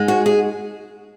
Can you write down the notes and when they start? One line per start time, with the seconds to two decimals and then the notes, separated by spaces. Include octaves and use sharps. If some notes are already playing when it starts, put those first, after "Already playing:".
Already playing: G#2 G#3
0.08 F#4
0.26 G#4